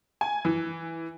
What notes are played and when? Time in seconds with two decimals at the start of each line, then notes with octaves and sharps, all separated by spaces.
0.21 G#5
0.45 E3